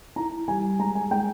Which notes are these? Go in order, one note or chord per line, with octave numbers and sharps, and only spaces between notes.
E4 A#5
G3 G#5
G#3 A#5
G#5
G#3 G5